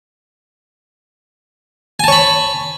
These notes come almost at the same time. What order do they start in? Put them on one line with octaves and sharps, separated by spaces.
G#5 A5 C#5 B5